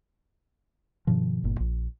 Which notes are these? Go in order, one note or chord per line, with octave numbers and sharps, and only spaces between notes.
G2 B2 D#3 F3
G1 A#2
A#1